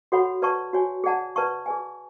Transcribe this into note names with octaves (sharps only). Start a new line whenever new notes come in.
F#4 A4 C#5 F#5 B5
B4 D5 A5 C#6
F#4 C#5 G#5
G#4 D5 F#5 A5
B4 D5 A5 C#6
G#4 B4 D5 G#5